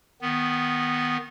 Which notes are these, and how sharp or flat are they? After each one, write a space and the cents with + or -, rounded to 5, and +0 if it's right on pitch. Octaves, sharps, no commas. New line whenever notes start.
D#3 +0 B3 +0